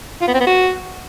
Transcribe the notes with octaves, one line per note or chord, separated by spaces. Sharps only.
F4
B3
C4
B3
F#4